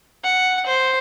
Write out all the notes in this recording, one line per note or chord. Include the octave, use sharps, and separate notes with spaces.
F#5
C5